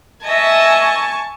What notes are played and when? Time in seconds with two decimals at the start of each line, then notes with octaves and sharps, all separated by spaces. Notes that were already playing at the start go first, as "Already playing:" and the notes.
0.24 D#5 E5 G#5 A5 C#6